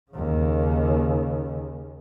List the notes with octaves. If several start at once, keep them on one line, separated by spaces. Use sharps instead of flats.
D#2 C#3